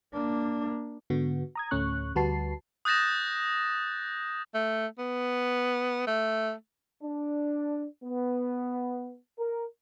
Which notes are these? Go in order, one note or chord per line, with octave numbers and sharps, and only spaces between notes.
A#3 D4
G#2 D3 B3 F#4
A#5 D#6 G#6
D2 A2 A3 C#4 C#6 F#6
D2 G3 F#4 B4 A5 C7
D#6 F#6 G6 A6 A#6 E7
A3
B3
A3
D4
B3
A#4